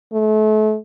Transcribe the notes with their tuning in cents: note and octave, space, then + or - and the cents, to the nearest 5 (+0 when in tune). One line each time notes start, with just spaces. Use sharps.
A3 -35